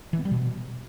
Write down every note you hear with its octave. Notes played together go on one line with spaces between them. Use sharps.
E3
B3
G3
B2